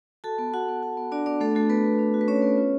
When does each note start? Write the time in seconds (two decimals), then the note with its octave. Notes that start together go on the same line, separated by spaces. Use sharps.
0.24 F#4 A4 A5
0.38 B3
0.53 F#4 F#5
0.68 B3
0.83 F#4
0.97 B3
1.12 D4 F#4 D5
1.26 B3 D4 D5
1.41 A3 D4 A4
1.55 A3 F#4 A4
1.70 B3 B4
1.85 B3
1.99 D4
2.14 F#4
2.21 B4
2.28 B3 C#4 C#5
2.42 B3
2.57 F4